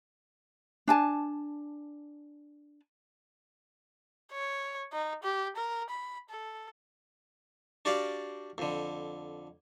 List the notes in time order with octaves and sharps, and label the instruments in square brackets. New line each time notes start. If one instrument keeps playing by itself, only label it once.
[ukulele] D4 G#5 A5
[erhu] C#5
D#4
G4
A#4
B5
A4
[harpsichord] D4 F#4 G4 D5 F5
F2 D3